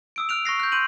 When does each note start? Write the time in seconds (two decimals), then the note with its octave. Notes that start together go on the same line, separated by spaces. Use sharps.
0.16 D#6 E6 D7
0.29 F6 F#6 D7 F7
0.45 C#6 F#6 A#6 C7
0.60 F#6 G6
0.72 C6 G6 D#7 F#7